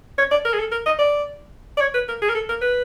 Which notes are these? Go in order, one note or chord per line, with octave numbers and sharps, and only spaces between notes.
C#5
D5
A#4
G#4
A4
A#4
D#5
D5
D5
C#5
B4
A#4
G#4
A#4
A4
A#4
B4